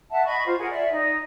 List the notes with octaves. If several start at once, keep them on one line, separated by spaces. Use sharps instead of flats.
E5 F#5 A5
D#5 B5 C#6
F4 C5
G#4 A#4 F#5 G#5
D5 E5
D#4